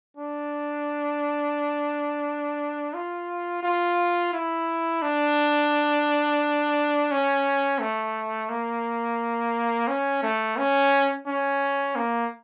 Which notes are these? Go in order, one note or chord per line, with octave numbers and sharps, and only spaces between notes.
D4
F4
F4
E4
D4
C#4
A3
A#3
C#4
A3
C#4
C#4
A#3